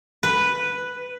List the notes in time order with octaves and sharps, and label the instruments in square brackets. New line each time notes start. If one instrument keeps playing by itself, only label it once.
[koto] B4